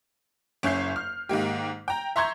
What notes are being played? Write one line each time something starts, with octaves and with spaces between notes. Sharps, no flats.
F#1 C#4 E5 G6 C7
F6
G#2 D#3 A#3 G4
G5 A#5
E5 A#5 C6 C#6 G6 G#6